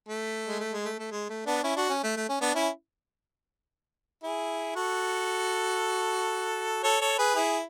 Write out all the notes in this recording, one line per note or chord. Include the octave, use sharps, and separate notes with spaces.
A3
G#3
A3
G#3
A3
A3
G#3
A3
B3 D4
C#4 E4
D4 F#4
C#4
A3
A3
C#4
B3 D4
C#4 E4
E4 G#4
F#4 A4
A4 C#5
A4 C#5
G#4 B4
E4 G#4